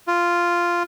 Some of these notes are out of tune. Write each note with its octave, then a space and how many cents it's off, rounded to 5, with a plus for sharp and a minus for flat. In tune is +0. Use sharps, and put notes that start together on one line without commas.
F4 -5